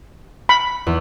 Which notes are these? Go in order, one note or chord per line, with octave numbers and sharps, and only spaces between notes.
B5
E2